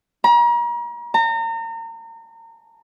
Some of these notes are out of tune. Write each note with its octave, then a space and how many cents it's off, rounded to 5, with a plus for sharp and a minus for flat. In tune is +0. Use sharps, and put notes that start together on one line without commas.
A#5 +40
A#5 -35